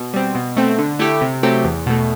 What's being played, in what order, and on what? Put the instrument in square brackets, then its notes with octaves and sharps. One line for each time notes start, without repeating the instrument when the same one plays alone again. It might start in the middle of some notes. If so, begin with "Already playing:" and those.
Already playing: [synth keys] B2
G3 C4
B2
A3 C4
D3
A3 E4 G4
C3
F#3 A3 C4 G4
E2
B2 A3